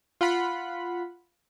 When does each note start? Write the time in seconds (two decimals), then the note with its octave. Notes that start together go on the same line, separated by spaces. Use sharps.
0.21 F4 F#5 B5